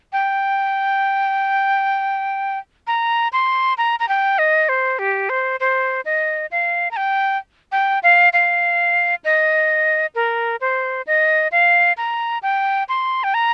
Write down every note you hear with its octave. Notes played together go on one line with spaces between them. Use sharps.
G5
A#5
C6
A#5
A#5
G5
D#5
C5
G4
C5
C5
D#5
F5
A#5
G5
G5
F5
F5
D#5
A#4
C5
D#5
F5
A#5
G5
C6
G5
A#5